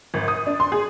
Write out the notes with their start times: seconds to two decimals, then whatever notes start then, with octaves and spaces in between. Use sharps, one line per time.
0.14 G#1
0.28 D#6
0.47 D4
0.60 C6
0.72 G#4